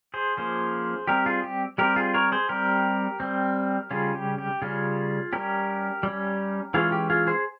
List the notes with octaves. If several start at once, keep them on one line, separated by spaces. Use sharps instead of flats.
G#4 C5
F3 A#3 C#4 G#4 C5
G3 C4 G4 A#4
F4 G#4
G4
G3 C4 G4 A#4
F4 G#4
A#4 C#5
G#4 C5
G3 C4 G4 A#4
G3 C4
C#3 G3 C#4 F4 G#4
G4
G4
C#3 G3 C#4 F4 G#4
G3 C#4 G4 A#4
G3 C#4
E3 G#3 C#4 F4 G#4
G4
F4 G#4
G#4 C5